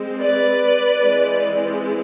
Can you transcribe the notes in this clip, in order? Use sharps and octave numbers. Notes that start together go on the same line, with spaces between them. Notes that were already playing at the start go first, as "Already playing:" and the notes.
Already playing: G#3 C4
B4 D5
E3 G#3 C4